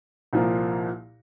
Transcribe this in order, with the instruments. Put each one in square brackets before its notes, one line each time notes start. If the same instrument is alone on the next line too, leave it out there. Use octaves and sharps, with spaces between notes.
[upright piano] C2 A#2 F3 A#3